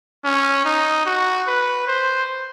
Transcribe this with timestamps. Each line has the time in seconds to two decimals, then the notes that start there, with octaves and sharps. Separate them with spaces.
0.24 C#4
0.65 D#4
1.06 F#4
1.48 B4
1.87 C5